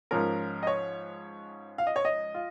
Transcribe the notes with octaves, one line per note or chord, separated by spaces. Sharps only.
G#2 F3 C#4 A#4
D#5
C#5
F5
D#5
C#5
D#5
F4